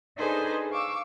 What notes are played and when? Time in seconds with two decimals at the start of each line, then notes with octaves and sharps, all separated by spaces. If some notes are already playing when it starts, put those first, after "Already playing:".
0.18 D4 D#4 G#4 A4 B4 C5
0.70 F5 C#6 D6 E6